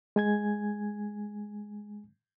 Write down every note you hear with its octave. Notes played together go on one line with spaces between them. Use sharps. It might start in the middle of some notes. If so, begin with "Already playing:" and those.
G#3 G#5 G#6